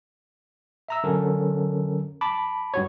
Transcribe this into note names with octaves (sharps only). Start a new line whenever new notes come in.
E5 A#5 E6
D3 F#3 C#4 A4 A#4
A5 B5 D6
G2 F#4 C#5